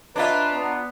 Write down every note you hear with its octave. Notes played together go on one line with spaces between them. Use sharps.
D4 F4 B4 C#5 D#5 E5 A#5
B3